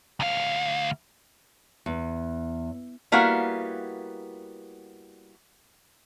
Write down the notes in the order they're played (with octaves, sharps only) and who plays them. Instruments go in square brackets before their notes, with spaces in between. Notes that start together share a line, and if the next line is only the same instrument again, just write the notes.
[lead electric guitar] D2 F5
[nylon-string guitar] E2
[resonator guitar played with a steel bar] G3 A#3 B3 E4 F#4 F5